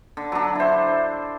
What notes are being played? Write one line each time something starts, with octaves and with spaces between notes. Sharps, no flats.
D3
F#3 D4
E4 C5